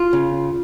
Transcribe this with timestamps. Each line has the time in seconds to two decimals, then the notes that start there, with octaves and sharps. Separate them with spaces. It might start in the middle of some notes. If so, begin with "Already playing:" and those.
Already playing: F4
0.13 C#3